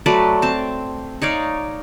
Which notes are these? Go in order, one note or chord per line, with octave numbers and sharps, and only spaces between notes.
F#3 A3 B4 D5
C4 A5
D#4 C#5 D5 F5